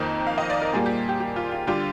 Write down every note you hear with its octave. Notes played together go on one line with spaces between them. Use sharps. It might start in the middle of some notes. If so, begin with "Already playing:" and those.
Already playing: F2 D#3 A#3 D#5
F5
D#5
D5
A#4
A#2 G3 A#3 G#4
G4
G4
G4
F4
F4
D3 G3 D4 F4 G4